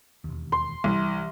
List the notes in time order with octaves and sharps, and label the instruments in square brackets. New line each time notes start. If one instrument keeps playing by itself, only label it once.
[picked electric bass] E1 D#2
[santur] C6
[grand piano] C2 [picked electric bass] E3 G3